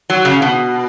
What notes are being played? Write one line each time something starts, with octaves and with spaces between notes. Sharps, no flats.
F#3
C#3
B2